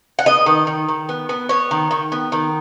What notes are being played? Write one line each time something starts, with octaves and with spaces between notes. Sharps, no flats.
F#5
B3 D#5
D#3
D#3
D#3
B3
B3
B3 C#5
D#3
D#3
B3
D#3